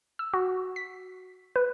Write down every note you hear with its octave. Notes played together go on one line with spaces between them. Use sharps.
E6
F#4
B6
B4